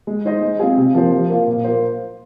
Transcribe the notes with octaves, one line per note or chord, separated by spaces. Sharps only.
G#3
D#4 C5 D#5
G#3
C4 F4 G#4
C3
F3 A#3 F4 C5
F3
A#3 F4
A#2
A#3 F4 C5